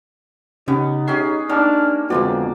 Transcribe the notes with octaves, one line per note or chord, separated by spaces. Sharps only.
C#3 B3 C#4 D#4 G4
C#4 G4 G#4 E5 C7
A#3 D4 D#4 G4 F6
F2 D3 G#3 B3 F#4 D5